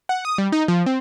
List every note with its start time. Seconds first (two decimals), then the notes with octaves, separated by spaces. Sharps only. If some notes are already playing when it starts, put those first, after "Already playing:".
0.09 F#5
0.25 D#6
0.38 G3
0.52 D#4
0.68 F3
0.86 C4